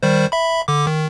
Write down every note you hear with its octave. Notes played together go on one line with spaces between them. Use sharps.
D#3 G3 C5
E5 B5
D3 D6
D#3